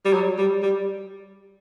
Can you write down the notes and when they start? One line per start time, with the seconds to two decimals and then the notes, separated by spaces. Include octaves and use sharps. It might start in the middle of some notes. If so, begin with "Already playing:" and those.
0.05 G3
0.13 F#3
0.38 G3
0.63 G3